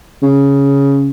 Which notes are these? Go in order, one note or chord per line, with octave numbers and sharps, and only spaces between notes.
C#3